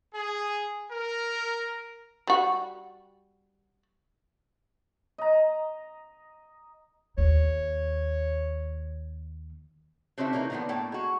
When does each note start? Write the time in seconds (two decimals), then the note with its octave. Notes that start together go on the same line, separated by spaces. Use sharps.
0.14 G#4
0.92 A#4
2.27 G3 F#4
5.18 D#5 A#5
7.18 D#2 C#5
10.18 C#3 C4 D4 D#4 F#4 E5
10.33 C#3 E3 A#3 C#4 D#4
10.50 D3 D#3 F3 G3 A#3 B3
10.69 A2 A#3 A4 G5
10.92 G#3 F#4